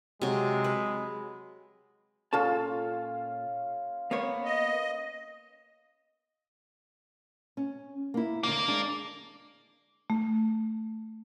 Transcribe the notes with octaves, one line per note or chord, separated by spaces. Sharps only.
C3 F#3 G#3
B4
A#2 C#4 F4 A4 A5
A#3 B3 C#5
D#5
C#4
A#3 E4
D#2 D3 A#3
G#3 D4
A3